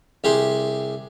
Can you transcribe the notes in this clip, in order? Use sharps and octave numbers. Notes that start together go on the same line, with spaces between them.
C2 G4 G#4 C6